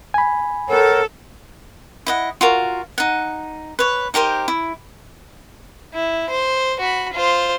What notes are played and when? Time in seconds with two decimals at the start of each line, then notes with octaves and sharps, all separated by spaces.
0.14 G#5 B5
0.68 A4 A#4 C#5 F#5
2.07 E4 D#5 F#5
2.41 F4 F#4 A#4
2.98 D#4 F#5
3.79 B4 C#5
4.14 D#4 G4 A#4 C5
4.48 E4
5.94 E4
6.30 C5
6.80 F#4 B5
7.13 F4 C5